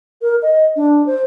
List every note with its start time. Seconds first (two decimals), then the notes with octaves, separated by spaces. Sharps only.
0.22 A#4
0.42 D#5
0.76 D4
1.06 C5